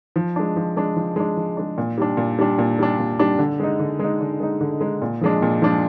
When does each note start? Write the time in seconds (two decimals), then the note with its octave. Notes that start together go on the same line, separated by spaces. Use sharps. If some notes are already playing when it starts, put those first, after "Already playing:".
0.16 F3
0.36 G#3 D4
0.56 F3
0.77 G#3 D4
0.96 F3
1.16 G#3 D4
1.37 F3
1.57 G#3 D4
1.78 A#2
1.98 G3 D4
2.17 A#2
2.39 G3 D4
2.59 A#2
2.79 G3 D4
2.99 A#2
3.19 G3 D4
3.39 D3
3.60 G#3 D#4
3.79 D3
3.99 G#3 D#4
4.21 D3
4.40 G#3 D#4
4.61 D3
4.81 G#3 D#4
5.02 A#2
5.21 F3 G#3 D4
5.42 A#2
5.62 F3 G#3 D4